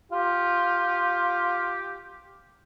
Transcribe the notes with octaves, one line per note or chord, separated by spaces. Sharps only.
F4 G4